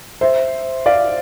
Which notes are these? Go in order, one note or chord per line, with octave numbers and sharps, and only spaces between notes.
C5 E5
D5 F5